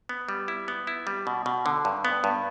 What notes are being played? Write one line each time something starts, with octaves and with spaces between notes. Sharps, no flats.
B3
G3
E4
B3
E4
G3
B2
B2
D3
G2
B3
G2